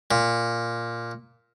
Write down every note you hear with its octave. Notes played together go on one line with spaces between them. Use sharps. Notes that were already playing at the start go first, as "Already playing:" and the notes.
A#2